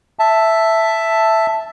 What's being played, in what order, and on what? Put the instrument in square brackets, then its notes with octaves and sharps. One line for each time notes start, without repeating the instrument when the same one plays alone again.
[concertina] E5 A5